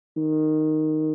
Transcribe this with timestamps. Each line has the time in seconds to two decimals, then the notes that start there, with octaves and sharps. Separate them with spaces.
0.17 D#3